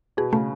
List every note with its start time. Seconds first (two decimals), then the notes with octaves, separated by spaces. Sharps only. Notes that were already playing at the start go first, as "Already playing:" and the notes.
0.17 B2 G#4
0.33 C#3 A3